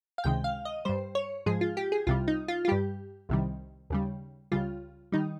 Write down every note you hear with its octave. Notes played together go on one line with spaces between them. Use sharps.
F5
C#2 C3 D#3 G#3 G5
F5
D#5
G2 G3 C5
C#5
G#2 F3 G#3 G#4
F4
G4
G#4
C2 C3 G3 F4
D#4
F4
F4
G2 G3 G4
C2 C3 D#3 G3
D#2 C#3 G3
C#2 C#3 G3 F4
D#3 G3 D#4